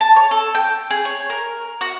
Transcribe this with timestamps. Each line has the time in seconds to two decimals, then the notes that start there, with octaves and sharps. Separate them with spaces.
0.01 A5
0.16 C#5
0.31 A4
0.55 G5
0.91 G#4
1.05 C#5
1.30 A#4
1.81 F#4